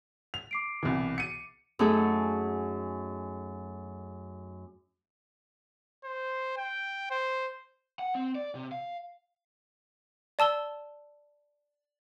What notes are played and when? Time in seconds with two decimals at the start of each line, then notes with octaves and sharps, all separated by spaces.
0.34 F7
0.51 D6 C7 D7
0.83 C2 B2 E3
1.18 C#7 D#7
1.79 F#2 A3 D#4 F#4 G#4 A4
6.04 C5
6.57 G5
7.10 C5
7.99 F#5
8.15 C4
8.35 D5
8.55 C3
8.72 F5
10.39 D5 A5 E6 G7